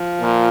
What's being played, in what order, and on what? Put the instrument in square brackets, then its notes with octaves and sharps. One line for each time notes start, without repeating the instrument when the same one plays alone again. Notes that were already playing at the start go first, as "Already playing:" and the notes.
Already playing: [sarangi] F3
[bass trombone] A#2